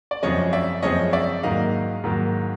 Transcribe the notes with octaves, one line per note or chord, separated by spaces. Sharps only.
D5
F#2 C#3 F3 G#3 C4 C#5 D#5
D5 E5
F#2 C#3 F3 G#3 C4 C#5 D#5
D5 E5
G#2 D#3 F#3 A#3 D#5 F5
G#2 D#3 F#3 A#3